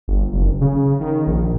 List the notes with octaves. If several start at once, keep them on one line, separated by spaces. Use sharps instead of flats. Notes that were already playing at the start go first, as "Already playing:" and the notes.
G1
F#1
C#3
D#3
A#1